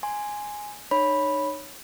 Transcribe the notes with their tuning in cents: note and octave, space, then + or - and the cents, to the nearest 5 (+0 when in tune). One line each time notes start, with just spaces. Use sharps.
G#5 +0 C6 +0
D#4 -35 C#5 +0 B5 -5